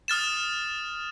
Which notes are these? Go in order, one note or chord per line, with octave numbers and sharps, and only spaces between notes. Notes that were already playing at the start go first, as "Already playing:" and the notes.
D#6 F6 A6 E7